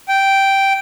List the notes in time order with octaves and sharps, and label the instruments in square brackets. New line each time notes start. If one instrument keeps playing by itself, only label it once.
[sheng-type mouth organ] G5